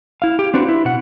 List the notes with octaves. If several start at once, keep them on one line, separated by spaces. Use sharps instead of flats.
E4 F5
G4
C4 D4 F#4 B4
E4
B2 F#5